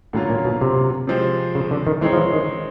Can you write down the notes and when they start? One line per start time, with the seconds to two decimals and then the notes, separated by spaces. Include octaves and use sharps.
0.13 A2 D3 F#3 A#3 C#4 F4
0.30 A#2
0.45 B2
0.61 C3
1.07 C3 F3 G#3 C4
1.55 C#3
1.71 D3
1.87 D#3
2.01 E3 G#3 C4 D#4 G#4 C#5
2.13 F3
2.17 E3
2.33 D#3